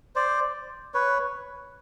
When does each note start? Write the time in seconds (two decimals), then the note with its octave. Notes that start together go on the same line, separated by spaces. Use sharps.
0.16 C5 D5
0.94 B4 C#5